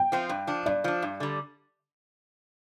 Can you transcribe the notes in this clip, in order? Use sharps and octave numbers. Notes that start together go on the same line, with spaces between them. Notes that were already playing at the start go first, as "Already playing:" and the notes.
Already playing: G5
F3 C4 F4
G2
F3 D4
G2 D5
F3 D4
G2
D3 G3